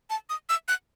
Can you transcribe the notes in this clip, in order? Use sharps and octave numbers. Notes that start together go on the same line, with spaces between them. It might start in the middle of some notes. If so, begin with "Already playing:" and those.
A5
D#6
E6
F#6